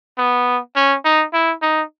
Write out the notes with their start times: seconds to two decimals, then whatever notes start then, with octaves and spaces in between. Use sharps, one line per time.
0.18 B3
0.76 C#4
1.05 D#4
1.33 E4
1.62 D#4